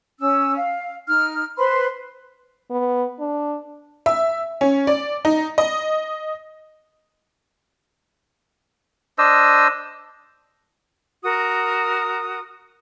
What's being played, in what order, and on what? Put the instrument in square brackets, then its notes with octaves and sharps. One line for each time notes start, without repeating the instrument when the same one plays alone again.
[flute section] C#4 E6
F5
D#4 F6
B4 C5 B5 C6
[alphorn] B3
D4
[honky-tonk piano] E5
C#4
D5
D#4
D#5
[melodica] D4 C5 D#5 E6
[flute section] F#4 A#4 D#6